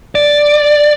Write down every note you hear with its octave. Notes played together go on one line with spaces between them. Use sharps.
D5